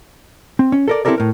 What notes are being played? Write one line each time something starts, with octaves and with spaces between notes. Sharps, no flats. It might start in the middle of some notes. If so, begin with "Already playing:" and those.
C4
C#4
A4 A#4 D5
C4 E4 G4 A4 A#4 D5
A2 A#4